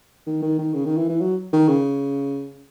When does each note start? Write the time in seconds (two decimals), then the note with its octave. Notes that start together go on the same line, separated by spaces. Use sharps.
0.27 D#3
0.42 D#3
0.59 D#3
0.74 C#3
0.85 D#3
0.97 E3
1.09 E3
1.21 F#3
1.53 D#3
1.68 C#3